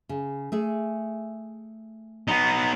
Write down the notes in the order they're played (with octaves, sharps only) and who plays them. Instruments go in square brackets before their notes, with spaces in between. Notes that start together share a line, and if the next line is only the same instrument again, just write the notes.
[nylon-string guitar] C#3
A3 G#4
[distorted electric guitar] B3 D#4